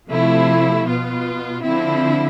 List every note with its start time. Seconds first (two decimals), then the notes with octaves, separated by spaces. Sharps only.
0.10 C3 F3 A3 E4
0.86 B2 B3 F4
1.63 D3 F3 C4 E4